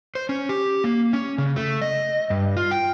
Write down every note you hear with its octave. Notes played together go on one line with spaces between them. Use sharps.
C5
C#4
G4
A#3
C#4
C#3
A3
D#5
G2
F4
G5